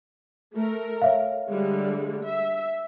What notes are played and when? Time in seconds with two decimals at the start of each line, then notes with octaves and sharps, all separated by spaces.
0.54 A3 A#4
1.02 C#5 E5 F5
1.48 D3 G3 G#3
2.24 E5